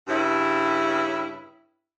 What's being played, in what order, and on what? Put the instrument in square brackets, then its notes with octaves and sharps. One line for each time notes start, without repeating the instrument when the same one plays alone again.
[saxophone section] G2 C#3 E4